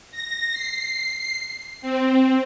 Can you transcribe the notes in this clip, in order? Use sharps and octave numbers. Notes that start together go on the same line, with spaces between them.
A#6
C7
C4